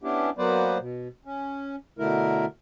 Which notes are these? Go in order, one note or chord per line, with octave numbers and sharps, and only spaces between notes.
B3 C#4 D4 E4 G4
F#3 A#3 B3 B4 C5 D5
B2
C#4
B2 D3 A3 E4 A#4